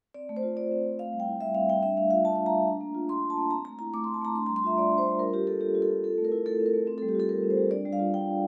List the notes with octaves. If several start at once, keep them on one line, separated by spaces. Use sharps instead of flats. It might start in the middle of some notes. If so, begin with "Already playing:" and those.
C4 D5
A3
C5
F4
A3 D5
C4
A3
C4 F5
G3
G5
E4
G3 E5
C4 F5
G3 G5
D4 E5
A3 F5
F4 F5
A3 A5
D4 A5
A#5
A3
D4
A#3
F4
A#3 C6
D4
A5
A#3
C4 A#5
A3 A#5
E4 A#5
A3 D6
C4 C6
A5
A3 A#5
D4 C6
G3 A#5
C6
F4 E5
G3 D5
D4
C5
G3
F4 A#4
F4 G4
A#3 A4
A#3 G4
F4
A4
F4
C4 A4
A3
A#4
E4
A3 A4
C4
A#4
A3
C4
G3 A4
G4
F4 A4
G3 A#4
C4
C5
G3
D4 D5
G3
F5
F4
G3 G5
D4